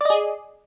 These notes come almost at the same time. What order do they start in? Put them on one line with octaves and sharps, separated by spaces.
D5 D#5 G#4